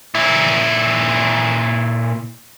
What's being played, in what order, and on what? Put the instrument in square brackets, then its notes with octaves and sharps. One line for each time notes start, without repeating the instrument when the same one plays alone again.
[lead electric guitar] A#2 E4